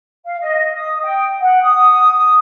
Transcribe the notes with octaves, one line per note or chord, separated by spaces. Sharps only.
F5
D#5
D#6
G5
F#5
D#6